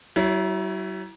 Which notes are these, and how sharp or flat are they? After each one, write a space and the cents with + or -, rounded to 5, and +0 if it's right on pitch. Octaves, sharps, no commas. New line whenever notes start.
F#3 +45 E4 +0 C#5 +0